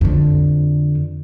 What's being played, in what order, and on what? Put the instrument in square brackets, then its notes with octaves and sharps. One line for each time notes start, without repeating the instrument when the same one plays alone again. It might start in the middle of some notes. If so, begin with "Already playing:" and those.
[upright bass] F2 D3